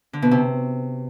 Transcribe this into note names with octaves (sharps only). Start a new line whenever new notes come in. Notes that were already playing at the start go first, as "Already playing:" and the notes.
D3
B2
C3